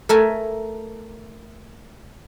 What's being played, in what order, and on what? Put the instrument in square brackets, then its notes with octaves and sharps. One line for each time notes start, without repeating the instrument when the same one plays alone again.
[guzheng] A3 A4 A#4 E5 G#5